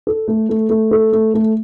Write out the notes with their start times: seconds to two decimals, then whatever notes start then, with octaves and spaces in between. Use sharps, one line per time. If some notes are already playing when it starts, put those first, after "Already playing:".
0.07 A4
0.28 A3
0.49 A3
0.70 A3
0.91 A4
1.13 A3
1.34 A3